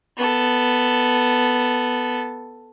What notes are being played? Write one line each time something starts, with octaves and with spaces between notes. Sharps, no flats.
B3 A4